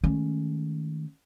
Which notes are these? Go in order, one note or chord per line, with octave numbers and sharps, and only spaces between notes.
D#3 G#3 A3 C#4